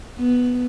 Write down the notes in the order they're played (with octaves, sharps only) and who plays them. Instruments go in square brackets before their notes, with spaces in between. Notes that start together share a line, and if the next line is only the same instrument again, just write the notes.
[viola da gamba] B3